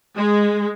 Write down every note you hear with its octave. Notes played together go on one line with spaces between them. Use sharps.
G#3